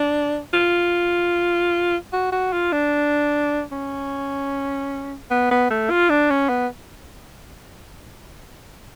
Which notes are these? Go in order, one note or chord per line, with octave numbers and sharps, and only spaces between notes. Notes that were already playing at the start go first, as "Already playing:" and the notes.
Already playing: D4
F4
F#4
F#4
F4
D4
C#4
B3
B3
A3
F4
D4
C#4
B3